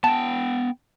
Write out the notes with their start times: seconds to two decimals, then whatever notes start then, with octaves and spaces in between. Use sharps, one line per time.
0.04 B3 G5 A5